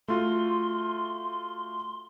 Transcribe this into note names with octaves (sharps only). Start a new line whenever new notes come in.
A3 F4 F#4 C6